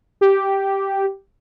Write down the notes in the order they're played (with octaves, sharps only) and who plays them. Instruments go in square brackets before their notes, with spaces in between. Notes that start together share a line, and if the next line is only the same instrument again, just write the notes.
[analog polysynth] G4